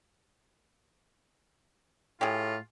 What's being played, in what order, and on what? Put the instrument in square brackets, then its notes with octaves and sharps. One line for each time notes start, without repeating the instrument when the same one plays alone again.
[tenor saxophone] A2 [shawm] F4 [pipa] G4 G#4